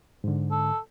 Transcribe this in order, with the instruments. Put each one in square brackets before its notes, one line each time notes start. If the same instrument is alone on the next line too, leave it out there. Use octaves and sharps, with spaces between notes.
[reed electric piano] G#2 D3
[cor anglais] A4